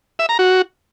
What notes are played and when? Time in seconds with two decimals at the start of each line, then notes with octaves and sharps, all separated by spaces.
0.19 E5
0.29 A#5
0.39 F#4